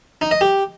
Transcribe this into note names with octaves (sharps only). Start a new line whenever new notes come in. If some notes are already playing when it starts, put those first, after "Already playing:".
D#4
D#5
G4